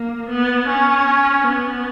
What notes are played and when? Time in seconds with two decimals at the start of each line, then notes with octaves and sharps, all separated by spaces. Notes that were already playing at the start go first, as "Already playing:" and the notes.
Already playing: A#3
0.29 B3
0.69 C#4
1.48 B3